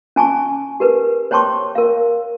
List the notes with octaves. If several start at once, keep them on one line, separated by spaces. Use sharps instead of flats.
C#4 G#5 A5 C#6
G4 A#4 B4
C5 C#5 G5 A5 C6 C#6
A#4 F5